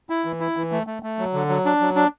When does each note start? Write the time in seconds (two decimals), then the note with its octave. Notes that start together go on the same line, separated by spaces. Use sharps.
0.10 E4
0.25 E3
0.40 E4
0.57 E3
0.72 A3
0.87 A3
1.03 A3
1.19 F#3
1.34 D3
1.49 F#3
1.65 D4
1.80 F#3
1.96 D4